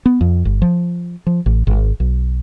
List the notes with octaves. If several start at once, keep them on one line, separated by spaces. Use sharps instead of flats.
B3
F2
G1
F3
F3
A1
G#1
B1